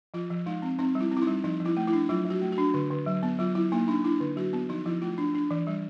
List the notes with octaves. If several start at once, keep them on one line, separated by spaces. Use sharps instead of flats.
F3 F4
F3
G#3 D#4
C4
C4 D#4
G3
E4
C4
E4
D#4
G3
F3 D#4
F3
E4
A3
E4
D4
F#3 F4
F#3
F#4
A3
F#4
D4
D3
D3
F#3
B3
F#3 F4
F#3 E4
A#3 D#4
D4 D#4
D4 E4
D3
F#3 F#4
B3
F3 D#4
F3 E4
A3 F4
D4
D4
E3
G3